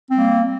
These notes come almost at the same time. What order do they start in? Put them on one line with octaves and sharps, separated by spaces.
C4 G3 A#3